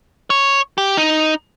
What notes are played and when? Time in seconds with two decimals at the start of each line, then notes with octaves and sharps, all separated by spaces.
0.30 C#5
0.78 G4
0.97 D#4